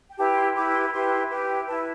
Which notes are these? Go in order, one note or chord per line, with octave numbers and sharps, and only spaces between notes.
G5
E4 G4 B4 A5
B5
C6
E4 G4 B4 D6
C6
B5
E4 G4 B4 C6
E4 G4 B4
E4 B4 A5